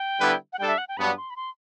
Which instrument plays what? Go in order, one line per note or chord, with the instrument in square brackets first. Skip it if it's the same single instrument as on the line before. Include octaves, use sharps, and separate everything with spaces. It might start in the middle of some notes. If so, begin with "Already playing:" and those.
Already playing: [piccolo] G5
[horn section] D3 G3 B3 E4 B4
[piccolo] F#5
[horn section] G3 D4 A4 [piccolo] G5
[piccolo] E5
F#5
G5
[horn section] G2 F#3 B3 D4 F#4 [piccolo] B5
[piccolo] C6
B5
C6